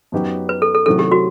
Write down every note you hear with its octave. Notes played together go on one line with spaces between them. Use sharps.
F#2 F#3 B3 D#4 G4
B4
A4
A4
C3 D#3 F#3 A3 E4 A4
G4
F#4